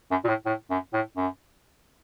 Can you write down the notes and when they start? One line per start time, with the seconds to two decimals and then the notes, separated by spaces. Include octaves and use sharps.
0.11 F#2
0.24 A#2
0.28 A2
0.46 A2
0.70 F#2
0.93 A2
1.17 F#2